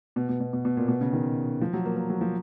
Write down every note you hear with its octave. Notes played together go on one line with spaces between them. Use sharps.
B2
B2
B2
B2
B2
A#2
B2
C#3
D#3
F3
F#3
A#3
A#3
F#3
F3